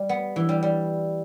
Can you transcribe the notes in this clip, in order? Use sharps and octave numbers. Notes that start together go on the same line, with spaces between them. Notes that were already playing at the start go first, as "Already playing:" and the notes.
Already playing: G3
B3
E3
G3
G3